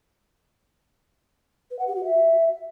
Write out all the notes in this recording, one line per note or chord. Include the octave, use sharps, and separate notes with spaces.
B4
F#5
G4
F#4
E5